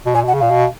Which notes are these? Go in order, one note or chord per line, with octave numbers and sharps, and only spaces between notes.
B2
A#2 G#5
B2
F#5
C#3
A#2 F5
B2